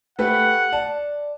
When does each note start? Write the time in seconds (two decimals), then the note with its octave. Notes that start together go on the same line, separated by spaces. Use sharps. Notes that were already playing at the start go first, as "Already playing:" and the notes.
0.19 A3 G4 B4 F#5
0.73 D5 A5